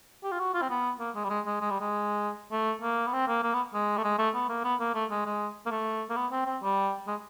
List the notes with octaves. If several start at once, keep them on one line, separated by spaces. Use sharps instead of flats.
G4
F4
F#4
F4
C4
B3
A#3
G#3
G3
G#3
G#3
G#3
G3
G#3
A3
A#3
B3
C4
A#3
A#3
B3
G#3
A3
G#3
A3
B3
A#3
B3
A#3
A3
G#3
G#3
A#3
A3
A#3
B3
C4
C4
G3
G#3